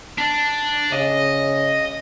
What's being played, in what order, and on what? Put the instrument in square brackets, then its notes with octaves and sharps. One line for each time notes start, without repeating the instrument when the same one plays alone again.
[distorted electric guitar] D4
[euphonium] C#3 [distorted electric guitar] D#5